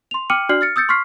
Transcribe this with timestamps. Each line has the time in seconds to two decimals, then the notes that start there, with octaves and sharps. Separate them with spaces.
0.11 C6 F7
0.30 G5 D6 F6 C#7 D#7 F#7
0.49 D4 F#4 D5 F6 C7 F#7
0.61 F6 A6 C#7
0.76 D#6 E6 G6 A6 C#7
0.89 C6 C#6 F6 B6 C7